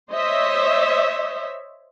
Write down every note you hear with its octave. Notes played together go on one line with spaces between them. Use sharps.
C5 C#5 D#5 E5